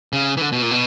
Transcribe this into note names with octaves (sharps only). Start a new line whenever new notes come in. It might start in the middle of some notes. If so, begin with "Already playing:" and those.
C#3
E3
D3
B2
A#2
B2